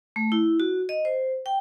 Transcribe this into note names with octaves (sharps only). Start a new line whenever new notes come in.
A3
E4
F#4
D#5
C5
G5